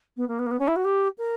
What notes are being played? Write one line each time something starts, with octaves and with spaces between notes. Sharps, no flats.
B3
A#3
B3
A#3
B3
C#4
E4
F#4
G4
A#4